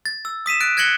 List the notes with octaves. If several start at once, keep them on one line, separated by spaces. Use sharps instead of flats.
A6
E6
D#6 B6 D#7 E7
F#6 A6 D7
F#6 G#6 A#6 C#7 F#7 G7